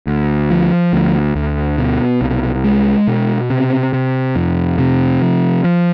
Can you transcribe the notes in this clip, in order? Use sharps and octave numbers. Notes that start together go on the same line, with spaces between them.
D2
F3
D2
D2
B2
C2
G#3
B2
C3
C3
F2
C3
F3
F3